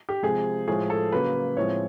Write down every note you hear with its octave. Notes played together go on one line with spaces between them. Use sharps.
G4
C3 F3 G#3 G#4
A2 F3 G#3 G#4
A4
C#3 F#3 A#3 B4
A2 F3 G#3 C4 C#5